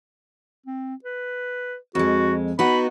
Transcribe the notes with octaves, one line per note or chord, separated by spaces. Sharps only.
C4
B4
F2 G#3 F#4
B3 D#4 F#4 B5